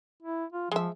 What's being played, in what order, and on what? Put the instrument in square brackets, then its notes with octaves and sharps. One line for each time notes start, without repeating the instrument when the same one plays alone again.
[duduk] E4
F4
[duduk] F3 [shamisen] G#3 E5